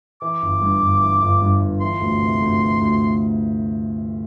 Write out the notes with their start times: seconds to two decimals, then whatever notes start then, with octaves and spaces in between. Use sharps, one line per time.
0.21 E3 D6
0.42 G1
0.62 G2
0.82 G1
1.01 E3
1.22 G1
1.42 G2
1.61 G1
1.81 E3 C6
2.01 D2
2.21 C3
2.41 D2
2.61 E3
2.81 D2